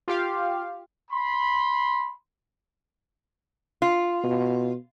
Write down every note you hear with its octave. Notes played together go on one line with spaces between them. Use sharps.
F4 G4 F5
B5 C6
F4
B2